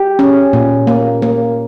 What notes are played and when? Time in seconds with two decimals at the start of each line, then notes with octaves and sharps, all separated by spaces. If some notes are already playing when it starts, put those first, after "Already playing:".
Already playing: G4
0.19 C#4
0.53 A#2
0.87 A#3
1.22 A#3